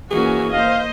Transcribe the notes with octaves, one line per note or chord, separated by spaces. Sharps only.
E3 A#3 C#4 F#4 G#4
A#3 C5 D#5 F5